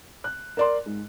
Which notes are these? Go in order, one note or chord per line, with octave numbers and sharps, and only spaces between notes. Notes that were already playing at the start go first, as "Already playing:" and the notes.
F#6
A#4 D5 C6
G#2